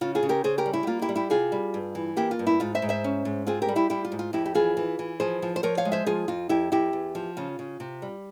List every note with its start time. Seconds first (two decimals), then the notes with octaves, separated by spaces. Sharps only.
0.01 C#3 F4
0.15 F4 G#4
0.23 C#3
0.29 G4 A#4
0.44 C#3 G#4 C5
0.58 G4 A#4
0.66 G3
0.73 E4
0.83 G4
0.87 A#3 F4
1.02 E4 G4
1.09 G3
1.16 E4 G4
1.30 C3 F4 G#4
1.52 G3
1.74 G2
1.95 E3
2.17 A#3 E4 G4
2.31 F4
2.39 G2
2.47 E4
2.60 G#2 F4
2.75 C5 E5
2.82 G#2
2.89 C5 E5
3.04 C#4
3.25 G#2
3.47 C4 F4 G#4
3.62 G4 A#4
3.68 G3
3.76 E4 G4
3.90 G3 E4 G4
4.05 F4
4.12 G#2
4.19 F4
4.33 F2 E4 G4
4.46 G4
4.54 E3 F4 G#4
4.77 E3
4.99 E3
5.20 F3 G#4 C5
5.42 F3
5.56 C5
5.63 F3 A#4 C#5
5.77 C#5 F5
5.85 G#3
5.92 C5 E5
6.06 F3 F4 G#4
6.28 F2 F4
6.49 F2 E4 G4
6.72 F2 E4 G4
6.93 E2
7.15 F3
7.37 C#3 F4
7.59 C#3
7.80 C3
8.02 G3